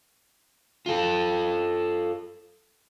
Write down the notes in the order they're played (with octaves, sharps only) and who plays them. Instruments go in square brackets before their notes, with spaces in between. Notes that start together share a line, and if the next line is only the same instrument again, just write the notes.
[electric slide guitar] F4 A4